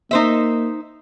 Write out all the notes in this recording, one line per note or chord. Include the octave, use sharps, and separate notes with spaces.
A#3 D#4 C5 E5